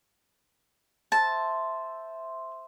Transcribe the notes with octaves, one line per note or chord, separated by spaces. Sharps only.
C5 E5 A5